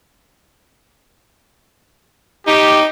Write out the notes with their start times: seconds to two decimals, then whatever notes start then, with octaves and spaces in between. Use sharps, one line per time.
2.47 D#4 G4